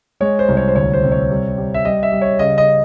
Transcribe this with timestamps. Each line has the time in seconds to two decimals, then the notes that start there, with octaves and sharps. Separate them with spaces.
0.20 G#3 C#5
0.39 C5
0.49 C2
0.57 C#5
0.68 C5
0.75 D2 C#5
0.94 C5
1.03 C3
1.12 C#5
1.31 G3
1.58 G3
1.74 E5
1.85 G3 D#5
2.03 E5
2.12 G3
2.21 C#5
2.39 C#3 D#5
2.58 D#5